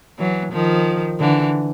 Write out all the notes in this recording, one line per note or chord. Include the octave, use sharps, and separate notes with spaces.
E3 F#3
D#3 F3
D3 E3